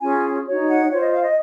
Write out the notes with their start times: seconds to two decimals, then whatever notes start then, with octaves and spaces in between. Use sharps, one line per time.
0.02 C#4 F4 G#4 G#5
0.46 D#4 F#4 C#5
0.68 F#5
0.90 F4 C5 C#5
1.01 D#5
1.12 F5
1.23 D#5